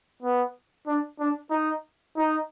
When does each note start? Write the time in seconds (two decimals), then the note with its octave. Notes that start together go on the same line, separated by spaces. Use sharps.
0.22 B3
0.87 D4
1.20 D4
1.51 D#4
2.17 D#4